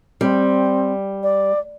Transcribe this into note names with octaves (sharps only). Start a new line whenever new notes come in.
G3 C4
D5